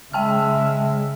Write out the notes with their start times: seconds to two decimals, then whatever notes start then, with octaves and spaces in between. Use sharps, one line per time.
0.13 C#3 G#3 E5 G5 A5 F6